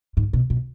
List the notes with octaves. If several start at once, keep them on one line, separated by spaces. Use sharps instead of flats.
G#2
B2
B2